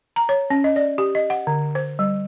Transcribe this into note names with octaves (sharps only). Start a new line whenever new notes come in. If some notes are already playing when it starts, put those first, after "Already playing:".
A#5
C#5
C#4
D#5
D5
G4
D#5
F#5
D3
C5
G3